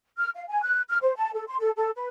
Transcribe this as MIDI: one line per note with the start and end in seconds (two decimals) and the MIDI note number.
0.17 0.29 89
0.36 0.46 77
0.48 0.61 80
0.63 0.82 90
0.89 0.98 89
1.02 1.14 72
1.16 1.31 81
1.34 1.44 69
1.48 1.56 84
1.60 1.70 69
1.77 1.90 69
1.95 2.08 71